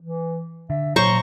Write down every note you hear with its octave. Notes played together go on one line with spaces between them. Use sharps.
E3
D3 E5
A#2 F#3 C5 C#5 A#5 C#6